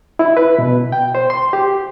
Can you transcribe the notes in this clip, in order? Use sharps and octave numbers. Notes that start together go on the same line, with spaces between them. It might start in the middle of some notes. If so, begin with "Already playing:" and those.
E4
B4
B2
G5
C5
C6
G4